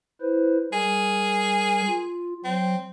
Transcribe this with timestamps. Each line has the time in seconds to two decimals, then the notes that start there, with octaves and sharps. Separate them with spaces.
0.21 E4 B4 C5
0.73 G3 G#4 A#4
1.87 F4
2.45 F#3 C4